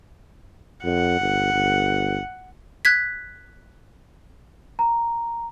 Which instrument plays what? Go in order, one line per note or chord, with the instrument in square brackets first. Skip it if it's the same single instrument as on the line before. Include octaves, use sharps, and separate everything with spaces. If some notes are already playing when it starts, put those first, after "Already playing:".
[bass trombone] F2 [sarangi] F#5
[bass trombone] G1
G1
[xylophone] F#6 G#6 B6
[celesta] A#5